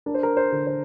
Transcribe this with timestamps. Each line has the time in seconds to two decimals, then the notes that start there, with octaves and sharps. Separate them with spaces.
0.06 D4 A#4
0.14 C5
0.23 A#4
0.37 C5
0.52 D3
0.67 C5